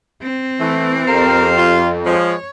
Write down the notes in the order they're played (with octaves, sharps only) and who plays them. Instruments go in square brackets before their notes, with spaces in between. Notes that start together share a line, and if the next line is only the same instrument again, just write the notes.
[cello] C4
[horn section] E3 [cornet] A3
[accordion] F2 [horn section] G4 C5 F5 [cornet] A#4
[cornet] F4
[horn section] F3 [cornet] G#3 [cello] C#5